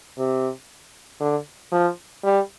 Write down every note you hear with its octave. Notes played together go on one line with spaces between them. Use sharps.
C3
D3
F3
G3